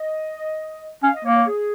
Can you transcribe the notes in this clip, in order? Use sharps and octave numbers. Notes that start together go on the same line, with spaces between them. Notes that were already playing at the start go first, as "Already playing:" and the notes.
Already playing: D#5
C#4 F5
D#5
A#3 C#5
C#5
G#4